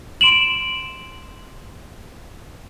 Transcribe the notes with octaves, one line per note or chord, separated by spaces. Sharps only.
C6 D7 E7 F#7